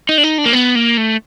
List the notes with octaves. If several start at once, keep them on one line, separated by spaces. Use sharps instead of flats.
D#4
D4
D#4
D4
A#3
B3
A#3
A3